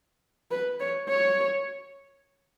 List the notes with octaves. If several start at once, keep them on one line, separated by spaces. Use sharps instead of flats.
B4
C#5
C#5